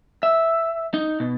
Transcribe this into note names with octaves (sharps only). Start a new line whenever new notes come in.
E5
D#4
B2